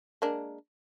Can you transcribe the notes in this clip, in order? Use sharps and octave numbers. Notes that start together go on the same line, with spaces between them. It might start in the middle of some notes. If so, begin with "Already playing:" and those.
G#3 A#3 D4